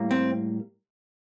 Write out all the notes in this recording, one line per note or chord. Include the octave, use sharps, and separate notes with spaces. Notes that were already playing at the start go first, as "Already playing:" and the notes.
Already playing: A2 G3 A#3
C4